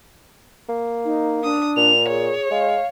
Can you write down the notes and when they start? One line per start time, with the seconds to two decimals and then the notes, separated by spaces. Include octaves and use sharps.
0.69 A#3
1.05 D#4
1.44 D4 D#6
1.77 A#2 F7
2.09 G#4 C#5
2.51 G#3 F5